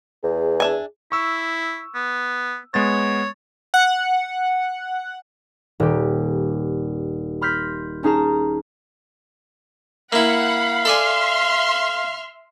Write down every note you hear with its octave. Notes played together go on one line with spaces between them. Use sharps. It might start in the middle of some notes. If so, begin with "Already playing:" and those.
E2 G#4
D4 E5 G#5
E4 C#6 E6
B3
G#3 B3 C#5 A6
F#5
D#1 G4
B5 C6 F6 G6 A#6 B6
C#4 D#4 G#4 A5 A#5
A#3 E4 F5 F#5 B5
A4 D5 E5 G#5 C6 F6